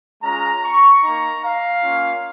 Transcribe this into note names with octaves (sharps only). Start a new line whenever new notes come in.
G#3 C#4 F4 A#5
C#6
A#3 D#4 A#5
F5
A#3 C#4 F4